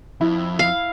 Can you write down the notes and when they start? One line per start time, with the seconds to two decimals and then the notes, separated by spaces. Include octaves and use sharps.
0.21 F2 E4
0.59 F5